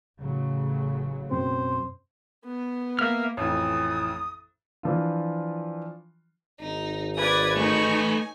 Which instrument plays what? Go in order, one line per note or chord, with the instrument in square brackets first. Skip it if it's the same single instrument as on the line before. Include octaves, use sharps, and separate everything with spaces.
[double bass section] A1 C#3 F#3
[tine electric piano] F#2 B2 C4 [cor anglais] C5
[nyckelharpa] B3
[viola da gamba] A#3 [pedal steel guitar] E5 F6
[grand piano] A1 F2 E3 [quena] D#6
[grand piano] E3 F3 D4 F4
[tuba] G#1 [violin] D#4
[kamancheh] B4 D5 [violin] D#6 G#6
[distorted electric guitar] A3 B4 [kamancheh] D#4 C#6 [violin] G#5